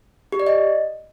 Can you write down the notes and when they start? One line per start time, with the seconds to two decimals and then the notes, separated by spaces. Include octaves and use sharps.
0.32 G4
0.40 D5
0.47 D#5